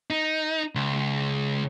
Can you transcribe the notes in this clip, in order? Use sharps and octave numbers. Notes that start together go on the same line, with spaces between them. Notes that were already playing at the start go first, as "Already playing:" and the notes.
D#4
C#2